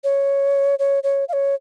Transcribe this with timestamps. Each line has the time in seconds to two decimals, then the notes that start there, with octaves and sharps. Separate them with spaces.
0.04 C#5
0.79 C#5
1.03 C#5
1.29 F5
1.33 C#5